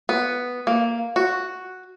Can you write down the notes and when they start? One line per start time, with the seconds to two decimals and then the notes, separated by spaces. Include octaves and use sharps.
0.09 B3
0.67 A#3
1.16 F#4